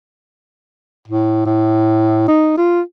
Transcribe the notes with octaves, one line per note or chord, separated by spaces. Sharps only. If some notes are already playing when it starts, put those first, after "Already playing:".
A2
A2
D#4
F4